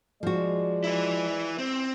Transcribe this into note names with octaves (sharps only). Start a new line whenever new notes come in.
F3 G#3 F#4 D5
E4 B4
C4